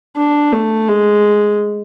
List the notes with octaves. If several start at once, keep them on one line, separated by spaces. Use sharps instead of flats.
D4
A3
G#3